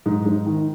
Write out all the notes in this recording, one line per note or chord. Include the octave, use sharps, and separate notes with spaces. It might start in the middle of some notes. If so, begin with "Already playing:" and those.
G#2
G#2
D#3